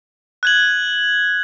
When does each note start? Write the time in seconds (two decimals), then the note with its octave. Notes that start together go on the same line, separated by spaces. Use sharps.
0.43 F#6 G#6 F#7